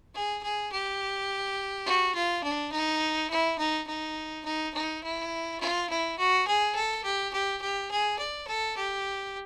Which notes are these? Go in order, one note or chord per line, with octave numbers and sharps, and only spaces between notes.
G#4
G#4
G4
F#4
F4
D4
D#4
E4
D#4
D#4
D#4
D#4
E4
F4
E4
F#4
G#4
A4
G4
G4
G4
G#4
D5
A4
G4